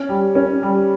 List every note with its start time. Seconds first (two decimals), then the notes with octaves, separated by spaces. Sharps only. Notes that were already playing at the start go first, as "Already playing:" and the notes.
Already playing: C#4
0.09 G3
0.35 C#4
0.63 G3